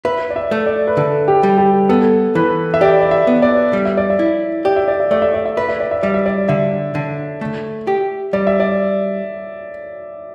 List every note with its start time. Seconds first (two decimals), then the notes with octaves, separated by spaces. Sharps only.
0.05 B4 E5
0.30 D5
0.36 E5
0.51 A3
0.66 D5
0.87 B4
0.97 D3 A4
1.28 G4
1.43 G3
1.58 G4
1.89 B3 A4
2.35 E3 B4
2.74 E5
2.81 G4 D5
3.01 D5
3.11 E5
3.27 B3
3.42 D5
3.73 G3
3.85 E5
3.97 D5
4.10 E5
4.19 E4
4.65 G4 D5
4.76 E5
4.88 D5
5.00 E5
5.11 A3 D5
5.22 E5
5.34 D5
5.45 E5
5.57 B4 D5
5.69 E5
5.80 D5
5.91 E5
6.03 G3 D5
6.14 E5
6.26 D5
6.48 D3 E5
6.95 D3
7.41 A3
7.87 G4
8.33 G3 D5
8.47 E5
8.60 D5